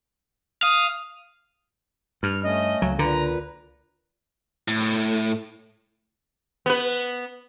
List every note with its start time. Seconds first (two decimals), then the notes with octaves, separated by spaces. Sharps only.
0.63 F5 D#6
2.23 G2 F6
2.43 A3 C#4 D#5
2.82 C#2 F#3
2.99 A#2 D3 B4 A#5
4.68 A2
6.66 B3 B4